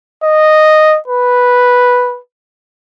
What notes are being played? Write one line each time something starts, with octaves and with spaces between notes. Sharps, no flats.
D#5
B4